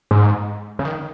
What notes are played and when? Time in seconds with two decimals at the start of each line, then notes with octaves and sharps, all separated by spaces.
0.11 G#2
0.79 C#3
0.85 D#3